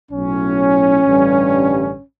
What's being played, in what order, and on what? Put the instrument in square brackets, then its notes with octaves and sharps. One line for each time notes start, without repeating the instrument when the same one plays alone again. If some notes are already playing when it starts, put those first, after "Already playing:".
[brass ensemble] B1 A2 F#3 C#4
A1 G2 D3 G3